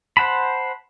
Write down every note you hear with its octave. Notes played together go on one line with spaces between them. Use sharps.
C5 F#5 A5 B5